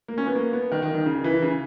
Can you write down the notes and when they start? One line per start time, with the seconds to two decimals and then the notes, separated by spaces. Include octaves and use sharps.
0.08 A#3
0.18 C#4
0.26 B3
0.35 A#3
0.53 B3
0.72 D#3
0.82 D#3
0.95 D#3
1.06 C#3
1.24 E3
1.42 C#3